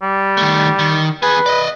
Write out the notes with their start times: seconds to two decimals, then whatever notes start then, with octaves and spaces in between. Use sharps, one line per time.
0.02 G3
0.37 D#3 A3
0.79 D#3
1.22 B3 G#4 B4
1.46 D5 D#5